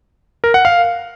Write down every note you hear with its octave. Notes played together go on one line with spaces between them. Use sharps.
A#4
F#5
F5